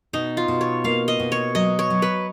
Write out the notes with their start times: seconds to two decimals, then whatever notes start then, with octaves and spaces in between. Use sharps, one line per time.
0.13 B2 D#4
0.37 F4
0.48 B2
0.61 C#5
0.84 A#3 F5
1.08 D#5
1.20 B2
1.32 C#5
1.55 F#3 D#5
1.79 C#5
1.90 F#3
2.02 B4